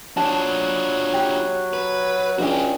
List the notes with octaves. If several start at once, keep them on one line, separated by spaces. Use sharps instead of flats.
F#3 D4 F4 A5
G4
B4
C#2 C#4 D4 F#4 G#4 G5